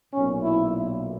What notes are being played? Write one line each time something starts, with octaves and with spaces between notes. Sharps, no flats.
B1 A#2 C#4
E4